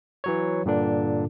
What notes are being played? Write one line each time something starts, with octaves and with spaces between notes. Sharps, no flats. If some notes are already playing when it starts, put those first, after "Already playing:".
E3 F#3 C#5
G2 A#2 D3 D4